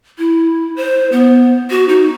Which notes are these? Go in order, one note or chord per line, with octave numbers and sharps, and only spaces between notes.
E4
C5
B3
F#4
D#4